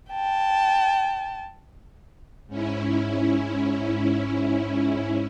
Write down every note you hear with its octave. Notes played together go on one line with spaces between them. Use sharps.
G5 A5
G#2 C#4 E4